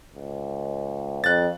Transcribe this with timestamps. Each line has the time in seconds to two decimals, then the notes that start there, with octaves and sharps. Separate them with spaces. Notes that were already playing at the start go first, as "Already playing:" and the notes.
0.15 C#2
1.24 F2 F#6 A6